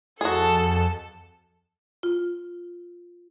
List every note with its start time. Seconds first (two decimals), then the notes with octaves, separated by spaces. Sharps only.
0.21 F2 F#4 G#4 A4 A5
2.03 F4